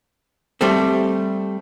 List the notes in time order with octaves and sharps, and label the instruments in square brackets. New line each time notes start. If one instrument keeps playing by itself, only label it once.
[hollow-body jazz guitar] G3 A3 C4